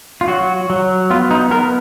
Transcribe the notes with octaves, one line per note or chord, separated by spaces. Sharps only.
F4
F#3 F#4
F#3
B3 F4
D#4
B3 A#4